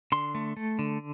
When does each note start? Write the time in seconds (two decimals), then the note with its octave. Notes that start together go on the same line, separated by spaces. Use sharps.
0.12 D3 C6
0.35 A3
0.57 A3
0.79 D3